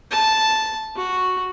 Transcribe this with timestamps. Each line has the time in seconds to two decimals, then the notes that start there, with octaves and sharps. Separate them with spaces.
0.11 A5
0.96 F#4